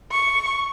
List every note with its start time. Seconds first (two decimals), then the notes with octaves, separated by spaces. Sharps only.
0.12 C#6